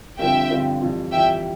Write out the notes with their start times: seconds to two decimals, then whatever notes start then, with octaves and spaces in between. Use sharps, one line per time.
0.19 G2 D3 F3 C4 E5 G5
0.50 G2 D3 F3 C4
0.81 F2 E3 G3
1.12 F2 E3 G3 E5 G5